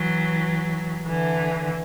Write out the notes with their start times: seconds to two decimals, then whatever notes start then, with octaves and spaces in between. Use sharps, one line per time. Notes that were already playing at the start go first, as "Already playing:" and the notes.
Already playing: E3 F#3
1.07 D3 E3